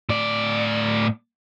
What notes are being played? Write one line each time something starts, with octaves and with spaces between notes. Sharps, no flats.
A2 D5